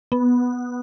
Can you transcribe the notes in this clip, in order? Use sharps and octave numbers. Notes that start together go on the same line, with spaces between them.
B3